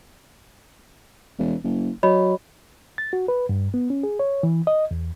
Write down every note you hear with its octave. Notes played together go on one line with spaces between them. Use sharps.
E1
F#1
F#3 C#5 D#5 B5
A6
F#4
B4
G2
B3
C#4
G#4
C#5
E3
D#5
E2